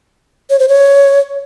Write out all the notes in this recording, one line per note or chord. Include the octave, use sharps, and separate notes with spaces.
C#5
C5
C#5